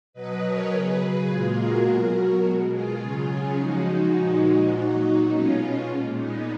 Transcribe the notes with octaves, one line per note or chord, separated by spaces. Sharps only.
B2 F#3 B4 D#5
A#4 C#5
C#3 F#3 G#4 B4
A#2 G#3 F4 G#4
F#4 A#4
B2 F#3
B2 G#3
F4 G#4
C#3 F#3
C#4 F4
C#3 F3 G#3 D#4 F#4
A#2 F3 G#3
A#2 F#3 D#4 F#4
B2 G#3 C#4 F4
A#2 G#3
B3 D#4